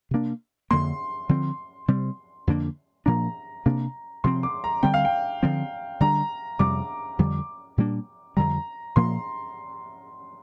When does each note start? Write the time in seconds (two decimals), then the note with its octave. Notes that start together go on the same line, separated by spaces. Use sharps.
0.11 C3 A#3 D4
0.71 F2 D3 A#3 C6
1.29 D3 F3 C4
1.88 C3 G3 C4
2.47 F2 D3 A#3 D4
3.06 A#2 F3 A#3 D4 A#5
3.66 C3 A#3 D4
4.24 C3 F3 C4 C6
4.43 D6
4.64 A#5
4.83 D3 G3 C4 G5
4.94 F5
5.05 G5
5.43 D3 F3 C4
6.00 D3 G3 D4 A#5
6.59 F2 C3 G3 D6
7.19 F2 D3 G3
7.78 A#2 G3 A#3 D4
8.37 F2 D3 G3 A#5
8.96 A#2 F3 A#3 C6